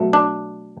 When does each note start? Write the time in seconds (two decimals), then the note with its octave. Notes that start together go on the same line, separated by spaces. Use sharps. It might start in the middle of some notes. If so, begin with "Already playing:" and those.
Already playing: B2 F#3 A3
0.13 D4